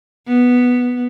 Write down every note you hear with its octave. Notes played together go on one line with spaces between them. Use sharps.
B3